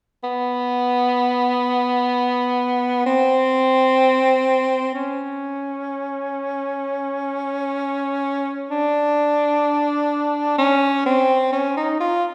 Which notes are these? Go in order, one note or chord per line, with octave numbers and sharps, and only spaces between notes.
B3
C4
C#4
D4
C#4
C4
C#4
D#4
F4